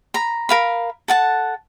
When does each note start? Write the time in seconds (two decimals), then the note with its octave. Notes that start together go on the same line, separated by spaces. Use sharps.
0.14 A#5 B5
0.49 A#4 F5 B5
1.08 A4 F#5 A5